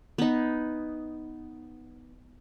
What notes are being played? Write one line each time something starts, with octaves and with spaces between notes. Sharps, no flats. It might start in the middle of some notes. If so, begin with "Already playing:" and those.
B3 D#4